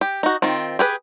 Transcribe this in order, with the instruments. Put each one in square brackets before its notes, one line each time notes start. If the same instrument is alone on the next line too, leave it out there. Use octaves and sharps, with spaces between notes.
[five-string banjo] G4
D#4 F#4
D#3 C4 F4
G4 G#4 B4